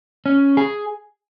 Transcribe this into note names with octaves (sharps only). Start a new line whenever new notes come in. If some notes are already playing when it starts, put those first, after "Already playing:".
C#4
G#4